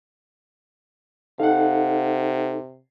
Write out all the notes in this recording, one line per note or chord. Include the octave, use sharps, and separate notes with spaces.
C3 D#4 A4 F5 F#5